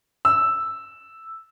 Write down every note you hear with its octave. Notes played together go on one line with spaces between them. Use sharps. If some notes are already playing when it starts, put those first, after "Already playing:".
E6